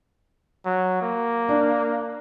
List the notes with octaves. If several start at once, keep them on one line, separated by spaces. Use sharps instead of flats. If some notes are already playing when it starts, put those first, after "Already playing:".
F#3
A#3
D4